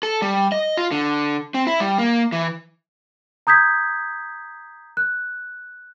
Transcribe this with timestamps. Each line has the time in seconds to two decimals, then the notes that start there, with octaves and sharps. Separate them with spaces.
0.03 A4
0.22 G3
0.52 D#5
0.77 F4
0.91 D3
1.54 C4
1.67 E4
1.80 G3
1.98 A#3
2.32 E3
3.47 A#5 D#6 G6 G#6 B6
4.97 F#6